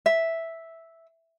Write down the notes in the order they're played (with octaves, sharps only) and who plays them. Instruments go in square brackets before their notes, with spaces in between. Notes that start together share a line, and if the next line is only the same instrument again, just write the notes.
[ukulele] E5